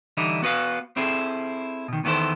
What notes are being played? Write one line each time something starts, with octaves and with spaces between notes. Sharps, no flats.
D3 E3 G3 D#4 E4
B3 F#4 B4 F5
C4 E4 G#4 A4
B2 D#3
E2 D#3 B3 E4 A4 C5